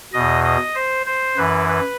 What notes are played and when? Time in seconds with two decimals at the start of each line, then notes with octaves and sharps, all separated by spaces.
0.13 E2 B2 D#5
0.44 D#5
0.75 C5
1.06 C5
1.37 F#2 E3 B4
1.68 B4